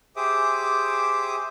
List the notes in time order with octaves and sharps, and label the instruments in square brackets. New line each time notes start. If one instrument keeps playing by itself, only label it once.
[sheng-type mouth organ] G4 G#4 C5 E5 D6 D#6